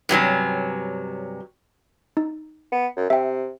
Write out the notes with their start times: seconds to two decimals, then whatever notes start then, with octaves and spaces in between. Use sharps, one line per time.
0.09 G2 C3 F#3 C#4
2.17 D#4
2.72 B3
2.97 F#2
3.10 C3 E5 G5